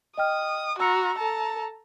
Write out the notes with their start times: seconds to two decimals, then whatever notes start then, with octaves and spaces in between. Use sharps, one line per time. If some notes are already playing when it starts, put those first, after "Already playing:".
0.17 D#5 G5 D#6 F6
0.79 F#4 A#5 B5 E6 C#7
1.18 A4 A5 A#5